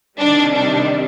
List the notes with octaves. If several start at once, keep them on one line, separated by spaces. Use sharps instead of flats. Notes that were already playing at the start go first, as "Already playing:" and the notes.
C3 D#3 G3 D4
D4